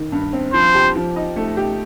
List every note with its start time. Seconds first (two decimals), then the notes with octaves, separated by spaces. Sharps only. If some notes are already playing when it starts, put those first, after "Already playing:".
Already playing: D#3
0.12 G2
0.33 C4
0.54 F3 C5
0.75 G4
0.95 F3
1.16 D#4
1.36 A3
1.57 G4